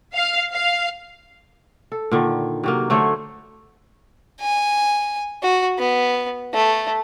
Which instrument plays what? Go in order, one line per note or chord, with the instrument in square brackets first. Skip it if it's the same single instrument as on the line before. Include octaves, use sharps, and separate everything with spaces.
[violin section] F5
F5
[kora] A4
A#2 D3 D#3
C3 F#3 A#3
D3 A3 C5 C#5
[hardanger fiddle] G#5
F#4
B3
A3